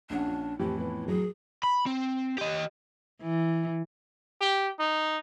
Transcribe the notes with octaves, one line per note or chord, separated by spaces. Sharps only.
A#1 C#4 D4 F#5
F4
F2 A2 E3 E4 G4
B3
F#3 G#4 A#4
B5
C4
G4 D#5
E3
G4
D#4